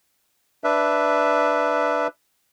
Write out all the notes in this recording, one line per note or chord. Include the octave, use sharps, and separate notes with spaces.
D4 B4 E5